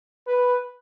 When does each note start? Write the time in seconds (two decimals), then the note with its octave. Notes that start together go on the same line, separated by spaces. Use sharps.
0.28 B4